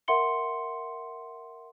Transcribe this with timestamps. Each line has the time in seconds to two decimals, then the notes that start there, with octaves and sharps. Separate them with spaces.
0.08 A#4 E5 F#5 C6 C#7 G7